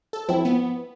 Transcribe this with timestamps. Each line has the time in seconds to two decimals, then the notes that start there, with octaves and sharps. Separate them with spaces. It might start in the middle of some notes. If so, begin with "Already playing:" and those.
0.13 A4
0.29 F3 C4 E4
0.45 B3